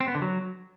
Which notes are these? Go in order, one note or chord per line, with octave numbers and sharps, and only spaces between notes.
C4
B3
D3
F#3